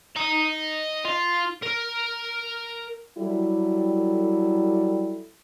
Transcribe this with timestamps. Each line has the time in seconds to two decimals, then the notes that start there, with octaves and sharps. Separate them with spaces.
0.17 D#5 A#5
1.05 F4
1.62 A#4
3.18 F#3 G3 E4 A4